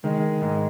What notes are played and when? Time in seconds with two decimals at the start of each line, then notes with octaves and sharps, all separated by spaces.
0.03 D#3 G#3
0.42 G#2